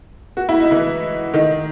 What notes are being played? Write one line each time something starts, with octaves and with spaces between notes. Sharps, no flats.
F#4
E4
D#4
E3 E4
D#3 D#4